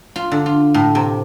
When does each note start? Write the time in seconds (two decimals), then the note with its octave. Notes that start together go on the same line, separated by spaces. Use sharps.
0.16 F4
0.31 D3
0.46 F4
0.74 A2
0.95 C3